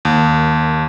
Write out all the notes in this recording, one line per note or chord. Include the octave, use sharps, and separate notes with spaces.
D#2